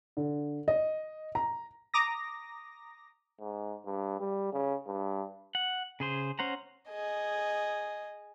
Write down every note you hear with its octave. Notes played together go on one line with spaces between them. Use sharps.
D3
D#5
A#5
A#5 D6 D#6 A#6
G#2
G2
G3
C#3
G2
F#5
C#3 G#4 C5
C#4 C5 F#5 A#5
G#4 D#5